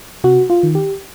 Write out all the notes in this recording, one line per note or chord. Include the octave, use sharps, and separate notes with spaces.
C3 F#4
F4
D#3
G4